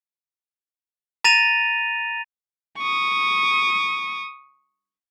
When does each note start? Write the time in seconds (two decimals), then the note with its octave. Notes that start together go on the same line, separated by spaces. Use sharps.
1.24 A#5 A6 A#6 D#7 F7
2.78 C#6 D#6